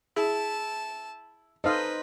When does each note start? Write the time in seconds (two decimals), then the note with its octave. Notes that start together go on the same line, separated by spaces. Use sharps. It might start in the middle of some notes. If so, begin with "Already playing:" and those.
0.16 E4 G#4 A5
1.64 D#4 A4 B4 C5 D#5 F5 F6